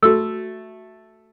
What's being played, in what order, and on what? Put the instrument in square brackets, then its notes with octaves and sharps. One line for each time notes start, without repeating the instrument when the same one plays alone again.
[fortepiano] A3 [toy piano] F#4 E6